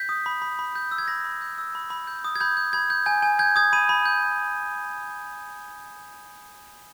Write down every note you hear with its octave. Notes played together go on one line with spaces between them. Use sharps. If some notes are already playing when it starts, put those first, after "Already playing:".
Already playing: G6 B6
D#6
B5
B5
B5
G6
E6
G#6
B5 A#6
B5
G6
E6
B5
B5
G6
D#6
G#6
B5 G6
G6
B5 G#6
G6
G#5 G6
G#5
G6 G#6
D#6 G#6
B5 D#7
B5
G6